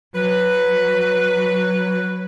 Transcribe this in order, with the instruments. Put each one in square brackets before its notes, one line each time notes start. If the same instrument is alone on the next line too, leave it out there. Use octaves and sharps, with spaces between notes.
[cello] F#3 [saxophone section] B4